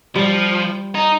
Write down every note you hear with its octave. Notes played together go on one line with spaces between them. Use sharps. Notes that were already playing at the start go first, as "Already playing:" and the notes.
F3 G3
D#4